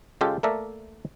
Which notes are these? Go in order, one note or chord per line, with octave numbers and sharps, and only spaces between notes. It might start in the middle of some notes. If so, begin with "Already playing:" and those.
C#3 G#3 F4 G4 A4
A3 A#3 A4 A#4 D5 E5